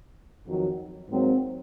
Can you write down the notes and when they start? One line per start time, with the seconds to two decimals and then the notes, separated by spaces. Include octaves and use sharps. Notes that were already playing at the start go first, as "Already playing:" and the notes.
0.46 F2 D#3 F#3
1.09 G#2 F#3 A#3 C4